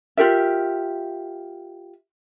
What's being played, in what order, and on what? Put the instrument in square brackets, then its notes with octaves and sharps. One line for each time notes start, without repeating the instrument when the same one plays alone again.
[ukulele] F4 G4 A#4 E5